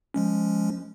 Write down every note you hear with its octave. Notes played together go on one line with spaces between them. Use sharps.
F3 G#3 C#4